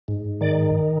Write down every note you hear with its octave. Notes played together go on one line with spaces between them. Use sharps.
G#2
D#3 D5